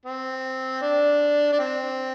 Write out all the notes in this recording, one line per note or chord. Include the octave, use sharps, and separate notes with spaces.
C4
D4
D4
C4